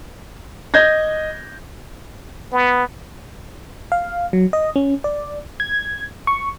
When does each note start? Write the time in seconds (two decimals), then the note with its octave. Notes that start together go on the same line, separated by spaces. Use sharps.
0.74 D#5 G6 G#6 A#6
2.52 B3
3.92 F5
4.33 F#3
4.53 D#5
4.76 C#4
5.04 D5
5.60 G#6
6.27 C#6